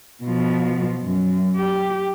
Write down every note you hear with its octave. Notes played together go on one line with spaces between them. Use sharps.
B2 F3
F#2
G4